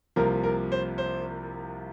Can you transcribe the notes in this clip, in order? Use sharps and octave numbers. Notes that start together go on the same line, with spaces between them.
C2 C3 F3 A#3 A#4
A#4
C5
C5